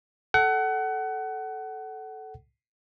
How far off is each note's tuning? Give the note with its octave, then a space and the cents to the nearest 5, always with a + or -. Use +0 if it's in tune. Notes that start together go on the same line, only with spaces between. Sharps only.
A4 -10 F#5 +25